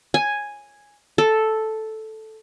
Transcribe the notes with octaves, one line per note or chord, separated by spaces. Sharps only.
G#5
A4